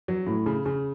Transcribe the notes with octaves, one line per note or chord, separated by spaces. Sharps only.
F#3
A2
C#3
C#3